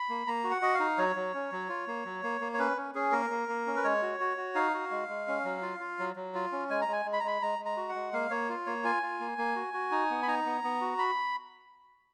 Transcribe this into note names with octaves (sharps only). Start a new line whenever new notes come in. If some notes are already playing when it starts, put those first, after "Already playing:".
Already playing: B5
A#3
A#3 A#5
F#4
F#5
F#4 D#5
F5
D#4
F#3 C#5
F#3
C#4
F#3
F4
A#3
F#3
A#3
A#3
C#5
C#4 B4
C#4
C#4 G#4
A#3 A#4
A#3
A#3
C#4
B4
G#3 C#5
F#4
F#4
F#4
D#4 F5
F#4
G#3
G#3
C#4
F#3
F4
F4
F#3
F#3
F4
C#4
G#3 G#5
A#5
G#3 G#5
G#3
B5
A#5
G#3 B5
G#3 A#5
G#3
A#5
F#4
F#5
G#3
A#3 F5
A#3 C#5
F4
A#3 C#5
F4 G#5
F4
A#3
A#3
F#4
F#4
D#4
B3
B5
D#4 A#5
B3
B3
F#4
B5